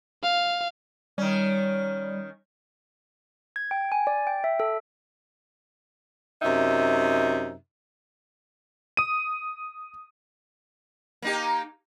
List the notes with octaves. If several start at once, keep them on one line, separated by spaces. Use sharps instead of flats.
F5
D#3 G3 C#4
G#6
G5
G#5
D5
G5
E5
A4
F#2 C3 D#4 E5
D#6 D#7
A#3 D#4 G4